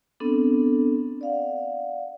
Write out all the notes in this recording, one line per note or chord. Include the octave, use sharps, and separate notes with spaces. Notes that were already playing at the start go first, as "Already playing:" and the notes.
B3 C4 D4 A4
D5 F5 F#5